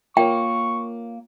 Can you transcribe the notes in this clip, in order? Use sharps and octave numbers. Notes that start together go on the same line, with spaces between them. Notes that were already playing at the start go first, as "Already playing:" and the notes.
A#3 F4 A#4 C#5 G5 C#6